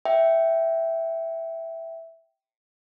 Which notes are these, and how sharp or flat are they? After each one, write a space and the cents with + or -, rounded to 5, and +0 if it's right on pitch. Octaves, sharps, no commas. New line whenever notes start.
E5 +0 G5 -15